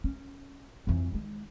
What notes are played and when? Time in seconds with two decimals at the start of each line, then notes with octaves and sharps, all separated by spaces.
0.04 C#4
0.87 F2 E3
1.12 D#3 G#3